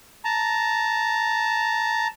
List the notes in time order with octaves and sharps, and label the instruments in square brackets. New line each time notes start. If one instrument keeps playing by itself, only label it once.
[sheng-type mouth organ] A5 A#5